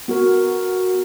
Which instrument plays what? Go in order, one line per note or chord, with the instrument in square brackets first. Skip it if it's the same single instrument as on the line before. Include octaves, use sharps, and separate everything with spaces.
[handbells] B3 F#4 A#4